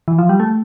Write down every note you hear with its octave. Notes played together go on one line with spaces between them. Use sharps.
E3
F3
G3
A3